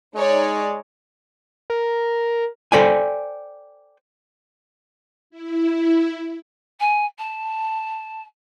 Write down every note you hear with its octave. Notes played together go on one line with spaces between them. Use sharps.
G#3 D#4 C#5 D5
A#4
A4 C5 D5 G5 G#5
E4
G#5
A5